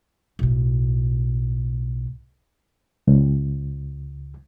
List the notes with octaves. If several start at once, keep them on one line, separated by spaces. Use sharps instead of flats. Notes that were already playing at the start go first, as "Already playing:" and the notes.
B1 A2
C#2